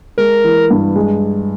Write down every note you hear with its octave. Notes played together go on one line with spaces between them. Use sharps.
G#3 A#4
E3
G2
G#3